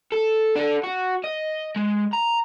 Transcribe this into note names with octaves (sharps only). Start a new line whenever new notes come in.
A4
D4 A4
F#4
D#5
G#3
A#5